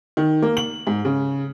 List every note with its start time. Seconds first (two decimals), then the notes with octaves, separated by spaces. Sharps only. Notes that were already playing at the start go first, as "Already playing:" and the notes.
0.17 D#3
0.42 A#3
0.57 F#7
0.87 G#2
1.05 C#3